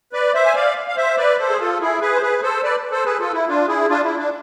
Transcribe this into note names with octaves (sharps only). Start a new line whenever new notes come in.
B4 D5
C5 E5
G#5
D5 F5
F5
C5 E5
B4 D5
A4 C5
G#4
F4 A4
E4 G#4
G#4 B4
C5
G#4 B4
A4 C5
B4 D5
A4 C5
G#4 B4
F4 A4
E4
D4 F4
E4 G#4
D4 F4
E4
D4